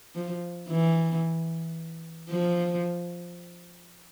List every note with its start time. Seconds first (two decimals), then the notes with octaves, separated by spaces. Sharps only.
0.15 F3
0.68 E3
2.29 F3